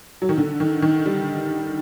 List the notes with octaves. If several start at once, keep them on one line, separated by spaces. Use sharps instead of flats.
F#3
D#3
D3
D#3
D#3
G3